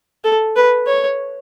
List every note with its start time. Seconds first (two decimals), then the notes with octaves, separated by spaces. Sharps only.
0.24 A4
0.56 B4
0.87 C#5